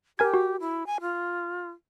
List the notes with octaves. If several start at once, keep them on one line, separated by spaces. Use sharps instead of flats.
G4 A#4 G#5 G#6
F#4
E4
G#5
F4